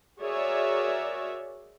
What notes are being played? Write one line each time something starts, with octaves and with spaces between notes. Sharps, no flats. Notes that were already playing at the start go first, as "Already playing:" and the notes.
F#4 G#4 A#4 C#5 D5 E5